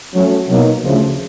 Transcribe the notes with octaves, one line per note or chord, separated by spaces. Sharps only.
F#3 A3 C#4 F#4
B2 F#3 A#3 D#4
D2 C#3 F3 A3